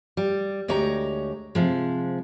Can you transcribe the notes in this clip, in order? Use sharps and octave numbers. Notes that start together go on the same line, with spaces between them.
G3
D2 G#3 G4 C#5 A#5
C3 F3 G#3